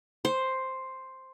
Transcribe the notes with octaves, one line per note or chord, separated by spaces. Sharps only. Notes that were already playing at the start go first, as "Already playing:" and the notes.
C5